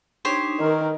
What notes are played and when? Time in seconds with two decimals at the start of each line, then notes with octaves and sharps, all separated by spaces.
0.25 D4 D#4 G4 C5 C#5 D#6
0.60 D#3 A#4 B4